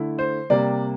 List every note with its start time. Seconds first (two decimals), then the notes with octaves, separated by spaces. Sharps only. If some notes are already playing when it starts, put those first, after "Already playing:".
Already playing: D3 A3 E4
0.19 C5
0.50 C3 G3 A#3 D5